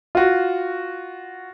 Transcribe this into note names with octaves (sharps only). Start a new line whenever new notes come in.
F4 F#4